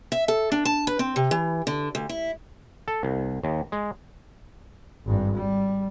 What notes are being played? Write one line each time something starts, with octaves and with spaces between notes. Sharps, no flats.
E5
A4
D4
A5
B4
C4
C3
E3
D3
D2
E4
A4
C2
D#2
G#3
G#1 G2
G3